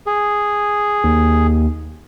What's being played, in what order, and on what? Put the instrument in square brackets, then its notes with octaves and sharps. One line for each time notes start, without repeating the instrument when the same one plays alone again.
[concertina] G#4
[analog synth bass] D#2